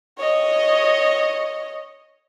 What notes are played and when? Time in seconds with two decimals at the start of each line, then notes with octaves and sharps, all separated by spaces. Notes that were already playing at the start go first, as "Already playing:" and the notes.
0.18 C#5 D#5